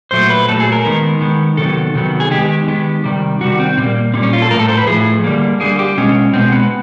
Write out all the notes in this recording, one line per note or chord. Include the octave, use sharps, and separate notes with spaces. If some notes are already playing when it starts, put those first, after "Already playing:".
A#2 F#3 A3 C5
B4
A#2 F#3 A3 A4
G#4
A#4
D#3 G#3 B3
D#3 G#3 B3
C3 D#3 F#3 B3 A4
C3 D#3 F#3 B3
G#4
D#3 G#3 B3 G4
D#3 G#3 B3
C3 D#3 G3
C3 D#3 G3 F#4
C4
A#2 G3 A#3 C4
A#2 G3 A#3 C4
C#4
F4
A4
A2 F3 A3 A#4
A4
C5
B4
A2 F3 A3 G#4
D3 G3 A#3
D3 G3 A#3 G#4
G4
B2 G#3 B3 C#4
B2 G#3 B3 C4
B3